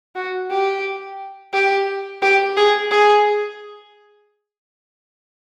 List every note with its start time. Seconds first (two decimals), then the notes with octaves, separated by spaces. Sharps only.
0.16 F#4
0.50 G4
1.53 G4
2.22 G4
2.57 G#4
2.91 G#4